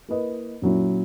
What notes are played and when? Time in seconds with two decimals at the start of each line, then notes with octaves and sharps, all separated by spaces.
0.08 A#3 E4 B4 D#5
0.62 A#2 F#3 C#4 E4